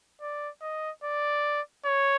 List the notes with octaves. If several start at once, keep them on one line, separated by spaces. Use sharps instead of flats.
D5
D#5
D5
C#5